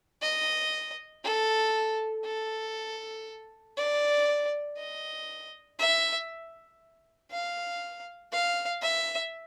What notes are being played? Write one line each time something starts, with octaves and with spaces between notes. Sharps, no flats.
D#5
A4
A4
D5
D#5
E5
F5
F5
E5